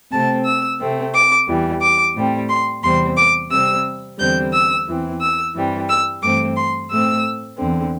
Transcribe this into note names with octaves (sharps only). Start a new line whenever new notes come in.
C3 A3 C4 A5
E6
C3 A3 C4
D6
E2 E3 G3
D6
A2 G3 C4
C6
E2 C3 G3 C4 C6
D6
C3 G3 C4 E6
E2 D3 G3 C4 G6
E6
E2 E3 C4
E6
G2 E3 G3 C4
E6
G2 E3 A3 C4 D6
C6
A2 A3 C4 E6
E2 D3 C4